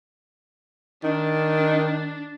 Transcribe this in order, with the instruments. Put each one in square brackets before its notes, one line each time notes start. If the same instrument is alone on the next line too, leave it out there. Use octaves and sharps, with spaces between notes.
[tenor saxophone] D#3 [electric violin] D4